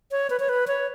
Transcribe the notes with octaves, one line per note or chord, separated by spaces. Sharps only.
C#5
B4
C#5
B4
C#5